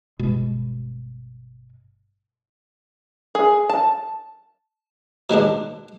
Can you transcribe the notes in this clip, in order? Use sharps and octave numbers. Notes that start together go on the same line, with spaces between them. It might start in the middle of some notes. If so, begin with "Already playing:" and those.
G1 B2 G#3
G#4
A5
B2 D#3 G#3 D4